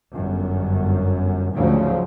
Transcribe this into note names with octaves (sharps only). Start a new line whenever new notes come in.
G1 F#2
D2 G#2 C#3 F3 F#3